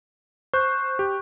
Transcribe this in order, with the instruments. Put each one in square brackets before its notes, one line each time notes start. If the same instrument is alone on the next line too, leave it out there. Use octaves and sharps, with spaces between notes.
[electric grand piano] C5 [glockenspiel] C#6 F#6 G6
[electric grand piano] G4